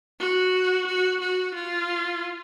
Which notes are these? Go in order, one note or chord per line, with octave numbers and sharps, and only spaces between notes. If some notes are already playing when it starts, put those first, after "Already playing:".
F#4
F#4
F#4
F4